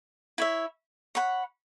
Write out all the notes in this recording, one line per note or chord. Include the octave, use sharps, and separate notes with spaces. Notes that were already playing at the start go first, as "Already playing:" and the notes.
E4 C#5 E5
C#5 F#5 B5